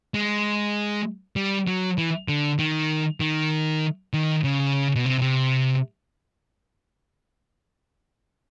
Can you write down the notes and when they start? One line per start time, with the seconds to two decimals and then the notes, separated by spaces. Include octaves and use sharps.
0.14 G#3
1.36 G3
1.68 F#3
1.98 E3
2.28 D3
2.59 D#3
3.20 D#3
4.13 D#3
4.44 C#3
4.96 B2
5.06 C3
5.21 C3